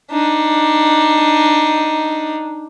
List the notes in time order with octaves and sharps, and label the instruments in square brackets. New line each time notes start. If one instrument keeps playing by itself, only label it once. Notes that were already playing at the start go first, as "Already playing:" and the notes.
[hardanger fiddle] D4 D#4